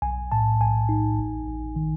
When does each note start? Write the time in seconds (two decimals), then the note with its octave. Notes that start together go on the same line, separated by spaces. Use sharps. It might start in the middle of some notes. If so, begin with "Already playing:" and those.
0.02 B1 G#5
0.32 A2 A5
0.60 B1 G#5
0.89 D#4
1.19 A1
1.47 A1
1.76 D#3